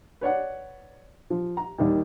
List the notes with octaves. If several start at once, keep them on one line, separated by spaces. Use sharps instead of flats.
B4 C#5 D5 F#5
F3
A#5
D#2 D#3 G3